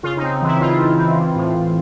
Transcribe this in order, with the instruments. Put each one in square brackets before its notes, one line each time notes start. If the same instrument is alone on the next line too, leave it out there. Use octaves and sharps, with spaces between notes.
[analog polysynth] C#3 F4
D#4
C4
E3 E4
C4 F4
C4
C4
E3
A2
A2